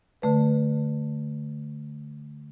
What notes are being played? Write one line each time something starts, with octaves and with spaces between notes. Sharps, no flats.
D3 A3 B4